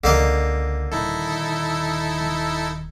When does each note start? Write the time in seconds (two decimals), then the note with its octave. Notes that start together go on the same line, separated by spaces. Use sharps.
0.04 C#2 D3 A#3 D#5
0.91 D#1 D#3 D#4 E4 A4